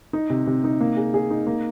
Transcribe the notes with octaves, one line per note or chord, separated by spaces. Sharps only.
D#4
C3
C3
D#4
A#3
G#4
G#4
D#4
A#3